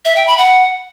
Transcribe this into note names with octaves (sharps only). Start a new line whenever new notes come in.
E5
G5
B5
F#5